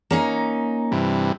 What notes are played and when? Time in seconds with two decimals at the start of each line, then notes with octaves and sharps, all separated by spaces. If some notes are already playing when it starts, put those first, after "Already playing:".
0.11 A#3 C#4 D#4
0.92 G2 C3 E3